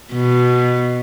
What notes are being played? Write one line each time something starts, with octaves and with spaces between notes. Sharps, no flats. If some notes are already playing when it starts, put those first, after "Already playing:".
B2